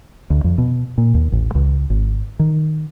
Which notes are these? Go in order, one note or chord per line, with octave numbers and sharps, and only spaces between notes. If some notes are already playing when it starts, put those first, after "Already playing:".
D2
F2
B2
A#2
D#2
A1
C#2
G#1
D#3